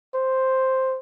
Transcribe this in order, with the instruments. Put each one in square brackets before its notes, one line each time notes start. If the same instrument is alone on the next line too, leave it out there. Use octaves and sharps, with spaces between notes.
[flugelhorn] C5